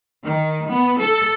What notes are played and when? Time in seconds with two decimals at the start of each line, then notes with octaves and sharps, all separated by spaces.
0.24 D#3
0.70 B3
1.01 A4